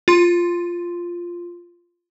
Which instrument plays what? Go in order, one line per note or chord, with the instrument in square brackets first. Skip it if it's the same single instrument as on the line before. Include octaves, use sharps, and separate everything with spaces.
[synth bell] F4 C6